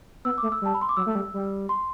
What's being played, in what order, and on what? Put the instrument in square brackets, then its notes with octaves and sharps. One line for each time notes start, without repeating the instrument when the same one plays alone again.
[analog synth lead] B3 [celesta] E6
[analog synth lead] A3 [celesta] D6
[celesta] E6
[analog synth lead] G3 [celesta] A5
[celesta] B5
C6
D6
[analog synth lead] F#3 [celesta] E6
[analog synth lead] A3
G3
G3
[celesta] C6